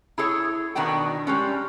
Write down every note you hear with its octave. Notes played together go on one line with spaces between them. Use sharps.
E4 G#4 A4 C#5
B2 D#3 B3 D4 F#4 G5
G3 G#3 C#4